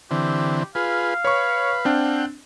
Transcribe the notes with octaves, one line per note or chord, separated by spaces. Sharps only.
D3 E3 C4 G4
F4 G#4 B4 F5
B4 C#5 C#6
C4 D4 F#5 G5